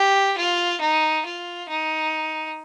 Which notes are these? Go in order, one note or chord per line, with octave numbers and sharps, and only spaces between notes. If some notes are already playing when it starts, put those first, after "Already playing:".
Already playing: G4
F4
D#4
F4
D#4